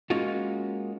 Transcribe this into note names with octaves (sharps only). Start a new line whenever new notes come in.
G#3 A#3 C#4 D#4 F4 F#4